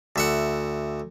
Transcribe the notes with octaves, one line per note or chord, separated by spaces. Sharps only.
D2 E5 F#5